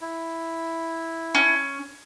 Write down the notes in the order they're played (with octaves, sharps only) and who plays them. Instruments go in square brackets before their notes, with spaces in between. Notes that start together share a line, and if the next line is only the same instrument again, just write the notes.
[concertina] E4
[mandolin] C#4